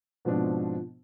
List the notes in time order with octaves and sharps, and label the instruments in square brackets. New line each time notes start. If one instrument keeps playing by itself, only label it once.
[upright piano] G#2 B2 F3 C4 D4